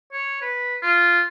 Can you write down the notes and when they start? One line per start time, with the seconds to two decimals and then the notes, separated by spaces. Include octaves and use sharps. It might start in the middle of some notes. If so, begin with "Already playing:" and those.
0.12 C#5
0.42 B4
0.82 F4